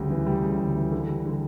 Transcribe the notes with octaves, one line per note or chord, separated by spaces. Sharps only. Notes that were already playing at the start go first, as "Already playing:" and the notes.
Already playing: D2 C#3 G3
E3
G3
C#3
D2
E3
D3
G3
D3